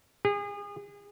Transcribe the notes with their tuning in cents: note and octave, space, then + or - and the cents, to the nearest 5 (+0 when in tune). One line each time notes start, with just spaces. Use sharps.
G#4 -35